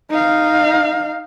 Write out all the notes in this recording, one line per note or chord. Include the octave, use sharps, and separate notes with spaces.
D#4 F5